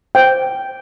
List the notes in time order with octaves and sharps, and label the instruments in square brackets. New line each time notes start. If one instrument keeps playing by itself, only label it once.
[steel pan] C5 G5